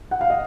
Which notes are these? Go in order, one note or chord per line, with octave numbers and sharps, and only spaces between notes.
F#5
F5
D#5